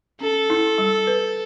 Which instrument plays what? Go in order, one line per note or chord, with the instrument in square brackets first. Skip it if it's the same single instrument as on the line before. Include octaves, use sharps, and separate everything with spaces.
[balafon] C#4 [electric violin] A4
[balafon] E4
G3
B4